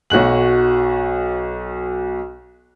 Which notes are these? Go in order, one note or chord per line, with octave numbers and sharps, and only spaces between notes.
B1 F#4 F#6 F#7